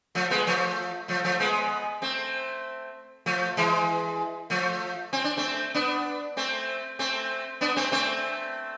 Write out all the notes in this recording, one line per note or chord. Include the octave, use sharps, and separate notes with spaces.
F3 A3
G#3 B3
F3 A3
F3 A3
F3 A3
G#3 B3
A3 C4
F3 A3
E3 G#3
F3 A3
C4
D4
A3 C4
B3 D4
A3 C4
A3 C4
B3 D4
A3 C4
A3 C4